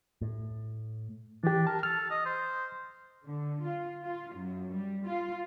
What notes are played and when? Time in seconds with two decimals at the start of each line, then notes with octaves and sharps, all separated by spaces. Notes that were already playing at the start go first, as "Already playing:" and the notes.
0.22 A2
1.44 E3 D4 G4
1.67 A#4 A5
1.83 A4 F6
2.10 D#5
2.25 C5
3.26 D3
3.65 F4
4.03 F4
4.36 F#2
4.73 G3
5.06 F4